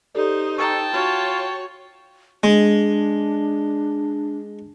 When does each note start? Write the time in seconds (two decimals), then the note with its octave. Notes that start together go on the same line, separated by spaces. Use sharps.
0.15 D#4 G4 A4 C5 D5
0.58 A4 G5 A5 A#5 C#6
0.93 F4 F#4 C#5
2.44 G#3 D4